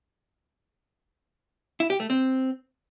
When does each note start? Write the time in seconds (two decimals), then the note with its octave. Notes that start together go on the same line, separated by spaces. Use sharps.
1.80 E4
1.90 G4
2.00 A3
2.10 C4